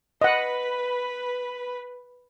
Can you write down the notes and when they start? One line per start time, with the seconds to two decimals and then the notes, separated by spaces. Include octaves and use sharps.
0.22 B4 D#5 F#5